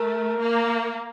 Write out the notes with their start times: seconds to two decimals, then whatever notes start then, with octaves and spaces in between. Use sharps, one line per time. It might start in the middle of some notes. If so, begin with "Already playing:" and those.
Already playing: A3 A#4
0.41 A#3